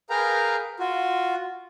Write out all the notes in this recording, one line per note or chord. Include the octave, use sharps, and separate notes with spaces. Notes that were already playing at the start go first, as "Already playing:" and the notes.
G#4 A#4 B4 F5 G5 A#5
F4 F#4